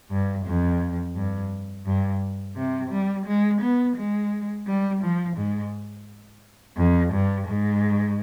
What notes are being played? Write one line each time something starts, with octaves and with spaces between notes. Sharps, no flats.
G2
F2
G2
G2
C3
G3
G#3
B3
G#3
G3
F3
G#2
F2
G2
G#2